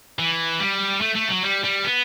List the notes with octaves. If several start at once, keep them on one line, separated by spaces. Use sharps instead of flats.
E3
G3
A3
A3
F#3
G3
G3
B3